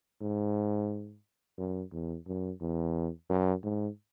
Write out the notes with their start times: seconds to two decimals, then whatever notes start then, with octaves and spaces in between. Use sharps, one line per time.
0.21 G#2
1.58 F#2
1.92 E2
2.27 F#2
2.61 E2
3.30 F#2
3.64 G#2